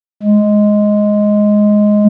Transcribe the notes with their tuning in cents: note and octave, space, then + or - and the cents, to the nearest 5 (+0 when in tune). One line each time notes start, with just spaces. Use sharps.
G#3 +5